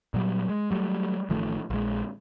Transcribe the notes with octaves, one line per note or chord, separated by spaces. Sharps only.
A#2 F#3 G3
G#3
F#3 G3 A3
A1 D#3 F3 A3
A#1 G#3